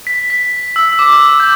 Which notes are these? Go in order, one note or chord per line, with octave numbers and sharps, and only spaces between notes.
B6
B6
E6
D6
E6
D6
G6